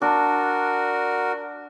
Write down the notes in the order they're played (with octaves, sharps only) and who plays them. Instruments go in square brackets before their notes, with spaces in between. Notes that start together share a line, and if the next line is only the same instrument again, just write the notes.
[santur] D4 [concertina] F#4 A#4